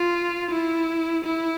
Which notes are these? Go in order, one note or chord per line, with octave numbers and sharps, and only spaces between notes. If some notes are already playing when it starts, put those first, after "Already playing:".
Already playing: F4
E4
E4